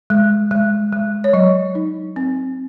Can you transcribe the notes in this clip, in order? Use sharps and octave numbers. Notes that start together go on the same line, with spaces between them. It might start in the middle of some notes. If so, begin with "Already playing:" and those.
G#3
G#3
G#3
C#5
F#3 D#5
D#4
C4